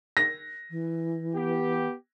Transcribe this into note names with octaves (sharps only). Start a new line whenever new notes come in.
A#6
E3
B3 G4